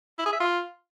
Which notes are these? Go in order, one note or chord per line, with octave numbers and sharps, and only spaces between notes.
E4
G#4
E5
F4